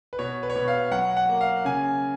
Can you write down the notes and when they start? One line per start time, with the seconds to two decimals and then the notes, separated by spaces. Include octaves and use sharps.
0.13 B4
0.19 B2 C#5
0.43 B4
0.50 C#5
0.56 B2 B4
0.68 F5
0.91 F#3 F#5
1.17 F#5
1.29 A#3
1.41 F5
1.65 C#3 G#5